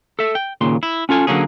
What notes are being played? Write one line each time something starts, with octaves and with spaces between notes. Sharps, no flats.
A4 E5
G5
D#2 A#2 C#3 C6
E4
C#4 F4 A4 G#5
D3 F#3 A#3 C#4 G#4